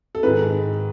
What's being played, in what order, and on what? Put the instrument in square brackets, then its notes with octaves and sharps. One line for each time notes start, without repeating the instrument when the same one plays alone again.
[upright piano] A4
G#2 D#3 G#3 B4